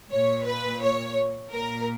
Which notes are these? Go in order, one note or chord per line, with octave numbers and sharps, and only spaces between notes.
A#2 C#5
B4
C#5
A#2 A#4